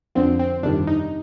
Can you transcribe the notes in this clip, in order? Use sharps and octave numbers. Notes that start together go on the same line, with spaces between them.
F2 D3 F3 C4
C4
G1 F2 C3 D#3 G3 D4
D#4